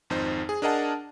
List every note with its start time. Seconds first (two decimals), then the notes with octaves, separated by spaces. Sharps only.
0.10 G#1 F2 D#4 C5
0.49 G#4
0.62 D4 G#4 A#4 D#5 F#5 A5